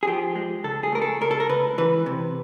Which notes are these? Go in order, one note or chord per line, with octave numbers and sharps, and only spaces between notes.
G#4
F3 G4
G#3
C#2 A4
G#4
A3 A#4
A4
C#2 A#4
A4
A#4
C#2 B4
E3 B4
C3